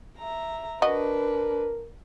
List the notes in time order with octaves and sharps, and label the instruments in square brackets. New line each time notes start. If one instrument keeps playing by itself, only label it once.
[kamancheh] E5 A#5
[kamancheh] D4 B4 [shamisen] F#4 D#5 [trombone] A#4